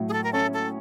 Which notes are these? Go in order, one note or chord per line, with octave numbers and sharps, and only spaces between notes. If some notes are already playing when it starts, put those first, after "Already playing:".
Already playing: A2 F#3
G#4
A4
A#4
C#4 A4
A4